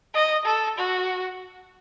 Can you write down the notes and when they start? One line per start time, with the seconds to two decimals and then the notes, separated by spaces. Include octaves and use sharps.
0.14 D#5
0.45 A4
0.78 F#4